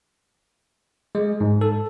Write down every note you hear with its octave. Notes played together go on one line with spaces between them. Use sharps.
G#3
G#2
A4